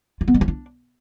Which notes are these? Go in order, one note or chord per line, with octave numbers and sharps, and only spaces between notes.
F4
B3
G#3
F4
D4